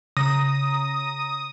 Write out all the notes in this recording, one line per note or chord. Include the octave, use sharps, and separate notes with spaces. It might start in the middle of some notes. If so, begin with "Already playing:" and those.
C#3 A#5 D#6 A#6